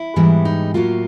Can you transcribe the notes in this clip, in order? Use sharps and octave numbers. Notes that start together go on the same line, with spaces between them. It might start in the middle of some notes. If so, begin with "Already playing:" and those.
Already playing: E4
G#2 E3 G3 B3
D#4
A2 F#3 A#3 F4